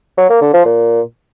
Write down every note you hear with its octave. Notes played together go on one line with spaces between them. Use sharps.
F#3
A#3
D3
F3
A#2